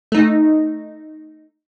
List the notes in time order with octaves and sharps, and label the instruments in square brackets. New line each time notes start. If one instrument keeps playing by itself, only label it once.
[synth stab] A3 D#4